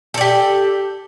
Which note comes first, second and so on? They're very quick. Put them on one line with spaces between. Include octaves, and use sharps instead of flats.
A4 D5 G4